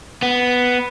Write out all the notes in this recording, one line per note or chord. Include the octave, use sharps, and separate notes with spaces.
B3